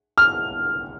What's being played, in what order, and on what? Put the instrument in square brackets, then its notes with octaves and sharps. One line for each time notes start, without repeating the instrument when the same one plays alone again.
[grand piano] F6